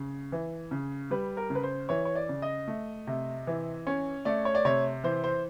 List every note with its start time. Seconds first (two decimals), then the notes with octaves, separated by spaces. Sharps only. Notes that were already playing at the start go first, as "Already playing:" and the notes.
Already playing: C#3
0.32 E3
0.71 C#3
1.11 G3 B4
1.37 A#4
1.50 C#3
1.55 B4
1.63 C5
1.89 E3 C#5
2.05 C#5
2.15 D5
2.29 C#3
2.42 D#5
2.68 A3
3.07 C3
3.47 E3
3.87 C#4
4.25 A3 D5
4.45 C#5
4.55 D5
4.65 C3 C#5
5.04 E3 C5
5.24 C5